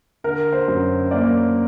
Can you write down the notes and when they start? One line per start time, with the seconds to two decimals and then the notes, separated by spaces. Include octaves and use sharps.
0.24 D3 A#4
0.52 C5
0.68 F#2
1.11 A#3 D5